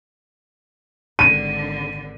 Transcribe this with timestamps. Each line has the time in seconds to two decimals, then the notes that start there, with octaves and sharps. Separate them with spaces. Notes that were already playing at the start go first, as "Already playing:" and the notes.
1.19 G#1 D3 D#7